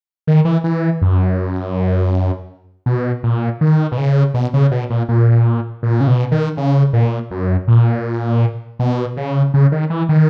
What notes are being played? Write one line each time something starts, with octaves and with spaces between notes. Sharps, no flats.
D#3
E3
E3
F#2
B2
A#2
D#3
B2
C#3
B2
C#3
B2
A#2
A#2
A#2
C#3
B2
D#3
C#3
A#2
F#2
A#2
B2
C#3
C#3
D#3
E3
D#3